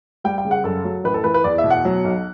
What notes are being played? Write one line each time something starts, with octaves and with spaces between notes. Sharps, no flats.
G3 G5
G5
C#3
F#5
F#2 A4
F#3
A1 B4
A4
E3 B4
B4
E2 D5
E5
B2
F#5
F#3
B1